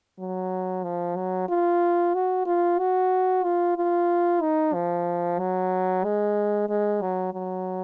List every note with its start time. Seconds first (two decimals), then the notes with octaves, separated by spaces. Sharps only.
0.19 F#3
0.83 F3
1.16 F#3
1.49 F4
2.14 F#4
2.46 F4
2.79 F#4
3.44 F4
3.77 F4
4.41 D#4
4.74 F3
5.39 F#3
6.04 G#3
6.69 G#3
7.02 F#3
7.34 F#3